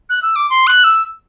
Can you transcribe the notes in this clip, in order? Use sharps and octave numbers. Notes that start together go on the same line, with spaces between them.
F#6
E6
D6
C6
F#6
E6